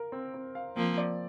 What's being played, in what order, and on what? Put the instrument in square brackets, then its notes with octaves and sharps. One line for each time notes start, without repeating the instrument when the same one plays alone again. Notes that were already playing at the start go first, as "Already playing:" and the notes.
Already playing: [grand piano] A#4 F5
C4
C4
F5
[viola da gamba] F3 A#3 [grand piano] C4
[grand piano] D5